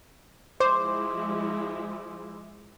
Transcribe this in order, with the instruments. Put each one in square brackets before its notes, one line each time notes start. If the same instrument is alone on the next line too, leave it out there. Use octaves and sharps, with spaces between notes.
[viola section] F3 G#3 E4 [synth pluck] C5 [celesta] C6 D6